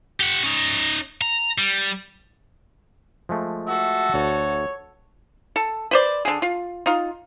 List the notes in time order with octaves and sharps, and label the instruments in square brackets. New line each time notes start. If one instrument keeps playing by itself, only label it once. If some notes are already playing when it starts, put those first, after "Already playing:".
[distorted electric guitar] G4 F#5
C#4 D#4
A#5
G3
[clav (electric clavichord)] F3 G#3 A3
[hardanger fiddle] F#4 A4 [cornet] E5
[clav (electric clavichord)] D2 [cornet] C#5
[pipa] A4
B4 C5 D5
D3 G#4
F4
D#4 F4